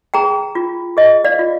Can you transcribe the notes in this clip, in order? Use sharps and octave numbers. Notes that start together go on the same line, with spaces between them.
G#4 G5 A#5
F4
G#4 D#5
D5 F5
F4